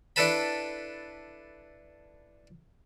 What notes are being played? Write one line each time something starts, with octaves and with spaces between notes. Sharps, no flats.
D4 E4 A4 B4 A5 B5